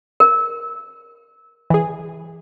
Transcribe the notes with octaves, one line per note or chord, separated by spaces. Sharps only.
A#4
E3 G#4